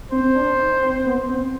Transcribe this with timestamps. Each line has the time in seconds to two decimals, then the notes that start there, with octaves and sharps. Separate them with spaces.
0.12 C4 C5
0.35 D4
0.59 D#4
0.82 C4
1.06 B3
1.29 C4